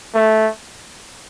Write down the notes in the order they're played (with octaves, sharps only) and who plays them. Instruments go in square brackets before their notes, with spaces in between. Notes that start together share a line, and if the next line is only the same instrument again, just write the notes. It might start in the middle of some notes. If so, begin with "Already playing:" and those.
[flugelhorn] A3